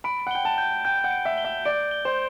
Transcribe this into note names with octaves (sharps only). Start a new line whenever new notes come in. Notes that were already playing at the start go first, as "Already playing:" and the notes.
B5 D7
F#5
G5 G7
A5
G6
G5 G6
F#5
D7
E5
G7
E5
D5 D7
G7
C5